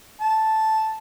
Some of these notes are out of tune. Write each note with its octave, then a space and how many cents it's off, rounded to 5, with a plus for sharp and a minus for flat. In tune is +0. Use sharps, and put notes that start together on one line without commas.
A5 -5